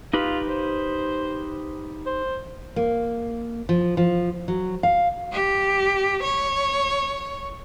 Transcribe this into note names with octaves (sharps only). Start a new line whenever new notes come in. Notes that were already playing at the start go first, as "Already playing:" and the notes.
D#4 F4 G4 B4
C5
C5
A#3
F3
F3
F#3
F5
G4
C#5